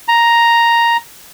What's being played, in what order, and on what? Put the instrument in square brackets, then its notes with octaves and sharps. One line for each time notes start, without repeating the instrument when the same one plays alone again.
[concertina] A#5